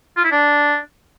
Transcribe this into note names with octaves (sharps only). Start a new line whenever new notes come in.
F4
E4
D4